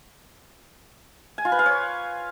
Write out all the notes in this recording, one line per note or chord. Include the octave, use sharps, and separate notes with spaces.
G#5
F4
B4
F5
C#5